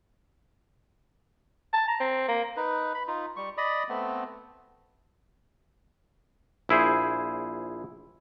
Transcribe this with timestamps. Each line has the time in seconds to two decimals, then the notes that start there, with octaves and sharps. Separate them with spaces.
1.73 A5
1.88 A#5
2.00 C4
2.28 A#3
2.57 D#4 B4
2.94 B5
3.07 D#4 F4
3.37 G3 C#6
3.58 D5 D#5 B5 D#6
3.89 A3 B3 C4
6.69 A#1 E4 G#4 C5